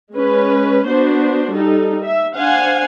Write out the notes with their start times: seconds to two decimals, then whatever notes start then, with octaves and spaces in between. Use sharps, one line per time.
0.11 G#3 C#4 B4
0.86 B3 D4 F#4 C5
1.51 G3 D#4 A4
2.03 E5
2.35 D4 C5 F5 F#5 G#5